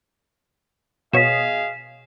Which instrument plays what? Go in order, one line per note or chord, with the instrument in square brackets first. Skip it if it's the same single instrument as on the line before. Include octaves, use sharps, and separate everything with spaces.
[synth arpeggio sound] B2 C#5 [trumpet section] G#4 D#5 F5 [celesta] B6 E7